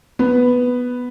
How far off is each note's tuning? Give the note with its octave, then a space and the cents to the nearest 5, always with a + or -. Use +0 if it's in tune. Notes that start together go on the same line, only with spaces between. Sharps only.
B3 +0 B4 +5